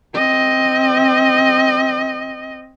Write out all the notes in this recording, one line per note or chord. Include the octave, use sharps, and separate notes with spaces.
C4 D#5